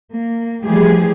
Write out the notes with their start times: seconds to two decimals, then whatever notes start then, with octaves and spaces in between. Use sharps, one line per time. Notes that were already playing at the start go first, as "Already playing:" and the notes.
0.14 A#3
0.64 E3 F3 G3 A3 G4 G#4